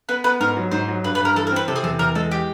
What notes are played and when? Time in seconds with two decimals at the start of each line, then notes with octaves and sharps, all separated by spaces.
0.09 B3 B4
0.24 B3 B4
0.40 G#2 A#4
0.57 F#3
0.72 G#2 C5
0.88 F#3
1.04 G2 B4
1.15 B4
1.20 G2 A#4
1.35 E3 A4
1.47 A#4
1.51 C4
1.56 B4
1.68 C3 A4
1.76 G#4
1.83 E2 A4
1.99 E2 A#4
2.15 G#3 A4
2.31 G4